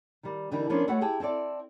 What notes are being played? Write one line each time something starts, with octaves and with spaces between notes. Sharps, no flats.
D#3 G3
D3 E3 G3 D#4 A#4
F3 B3 C#4 D4 A#4 C5
G#3 A3 F#4 B4 C#5 F#5
E4 G4 G#4 G5 A5
C4 E4 A4 D5